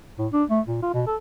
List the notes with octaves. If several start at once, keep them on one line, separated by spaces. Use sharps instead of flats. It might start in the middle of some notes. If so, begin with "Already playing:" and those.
A2
D4
A3
A#2
F4
B2
A4